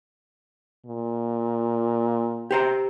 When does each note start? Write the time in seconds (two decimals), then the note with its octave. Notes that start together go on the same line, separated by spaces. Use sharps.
0.86 A#2
2.51 G4 C5 A#5